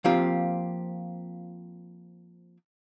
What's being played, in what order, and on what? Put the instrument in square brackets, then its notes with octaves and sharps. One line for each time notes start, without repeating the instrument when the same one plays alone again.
[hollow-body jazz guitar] F3 A#3 C4 F4 G4